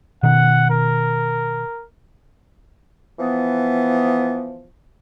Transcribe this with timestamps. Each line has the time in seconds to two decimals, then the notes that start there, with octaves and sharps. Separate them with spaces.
0.23 B2 D#3 F#5
0.71 A#4
3.19 E3 F3 B3